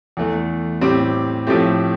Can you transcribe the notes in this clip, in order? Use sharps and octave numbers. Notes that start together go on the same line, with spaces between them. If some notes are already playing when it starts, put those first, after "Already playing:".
E2 E3 A3
A2 G3 C4 G4
A2 F3 A3 C4 G4